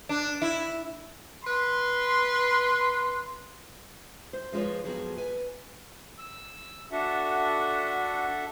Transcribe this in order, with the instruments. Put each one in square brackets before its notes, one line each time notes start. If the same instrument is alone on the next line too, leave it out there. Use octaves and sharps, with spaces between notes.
[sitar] D4
E4
[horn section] B4 B5 C6
[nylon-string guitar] C5
F3 G#3 F4 B4 C#5
F2 F3 F#3 B3 G#4
B4 G#5
[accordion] E6
[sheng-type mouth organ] D4 F#4 [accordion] A4 E5 F#5